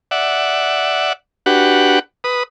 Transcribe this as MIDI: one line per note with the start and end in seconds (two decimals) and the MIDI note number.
0.11 1.13 74
0.11 1.13 76
0.11 1.13 78
1.46 1.99 62
1.46 1.99 66
1.46 1.99 67
1.46 1.99 71
1.46 1.99 78
2.24 2.43 71
2.24 2.43 87